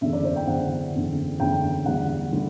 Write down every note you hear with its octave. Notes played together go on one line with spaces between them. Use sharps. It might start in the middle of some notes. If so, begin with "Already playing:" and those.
F#1 E2 D3 E5
D5
C5
G5
F#1 E2 D3 F#5
F#1 E2 D3
F#1 E2 D3 G5
E1 E2 D3 G3 F#5
D3 G3